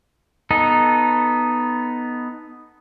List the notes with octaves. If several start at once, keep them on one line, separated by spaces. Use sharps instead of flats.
B3 D#4 A4